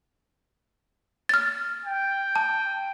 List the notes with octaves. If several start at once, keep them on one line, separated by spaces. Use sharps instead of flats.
F6 A6
G5
A5